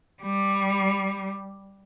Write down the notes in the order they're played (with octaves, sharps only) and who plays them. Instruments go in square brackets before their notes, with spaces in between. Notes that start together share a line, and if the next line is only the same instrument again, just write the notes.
[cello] G3